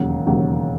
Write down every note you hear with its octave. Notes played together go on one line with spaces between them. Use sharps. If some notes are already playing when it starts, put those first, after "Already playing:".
Already playing: E1 D#2 C#3 F#3
E1 D#2 C#3 F#3